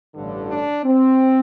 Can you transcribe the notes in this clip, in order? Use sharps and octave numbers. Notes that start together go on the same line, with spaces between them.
A1 G2 D3
D4
C4